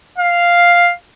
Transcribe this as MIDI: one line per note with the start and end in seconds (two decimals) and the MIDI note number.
0.18 0.92 77